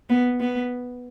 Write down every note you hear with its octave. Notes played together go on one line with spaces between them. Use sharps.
B3
B3